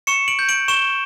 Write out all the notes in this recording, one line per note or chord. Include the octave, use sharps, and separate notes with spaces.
C#6 C#7 E7
D7 F#7
G6
D7 F#7
C#6 E7 G7